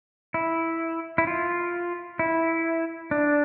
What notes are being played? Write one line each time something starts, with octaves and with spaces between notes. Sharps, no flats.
E4
E4
F4
E4
D4